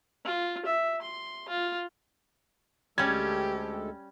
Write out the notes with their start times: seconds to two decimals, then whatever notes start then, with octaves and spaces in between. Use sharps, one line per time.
0.24 F4
0.65 E5
1.02 C6
1.49 F4
2.98 D2 G3 G#3 C#4 G4 A4 G#6